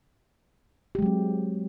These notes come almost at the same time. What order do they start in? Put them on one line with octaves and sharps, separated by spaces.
G4 G#3 F#3 C4